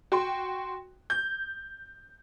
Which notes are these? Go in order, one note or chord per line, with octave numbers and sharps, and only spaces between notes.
F#4 G5 C6
G6